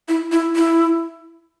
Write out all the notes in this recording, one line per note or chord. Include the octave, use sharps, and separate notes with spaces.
E4
E4
E4